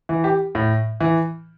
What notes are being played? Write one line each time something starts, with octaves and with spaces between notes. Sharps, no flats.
E3
G4
A2
E3